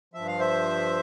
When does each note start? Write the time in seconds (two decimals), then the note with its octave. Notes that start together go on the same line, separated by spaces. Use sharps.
0.14 G2 F3 E5
0.27 F5
0.40 C5 E5